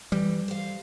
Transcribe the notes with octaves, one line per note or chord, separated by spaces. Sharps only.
E3 G3
C5 F5